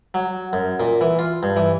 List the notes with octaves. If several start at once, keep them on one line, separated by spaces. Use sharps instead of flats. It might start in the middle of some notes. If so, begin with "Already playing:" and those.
F#3
F#2
A#2
E3
F4
G2
E3